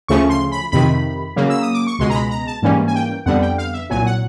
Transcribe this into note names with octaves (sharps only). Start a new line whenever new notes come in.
D2 C#3 F3 A3 C#4 C#6
C6
B5
F2 C3 D#3 B5
C#3 F#3 A#3
E6
D#6
D6
C#6
C#2 B2 G#3 C6
A#5
B5
A#5
A5
G#2 E3 G3 A#3 C#4
G#5
G5
F2 D3 G3 B3 F#5
G5
F5
E5
C2 A#2 F#3 G#5
F#5